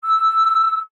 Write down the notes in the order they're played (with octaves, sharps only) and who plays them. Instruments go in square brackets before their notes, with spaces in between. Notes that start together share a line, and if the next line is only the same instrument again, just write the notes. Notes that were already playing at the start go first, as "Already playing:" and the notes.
[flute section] E6